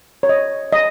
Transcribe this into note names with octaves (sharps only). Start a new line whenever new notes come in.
C#5
D#5
D#5